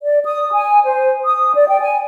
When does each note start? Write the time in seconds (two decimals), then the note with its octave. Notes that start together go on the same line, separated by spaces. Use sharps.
0.04 D5
0.24 D#6
0.53 G#5
0.85 C5
1.23 D#6
1.55 D5
1.68 G5
1.81 G#5